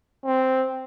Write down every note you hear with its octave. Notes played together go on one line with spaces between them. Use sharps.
C4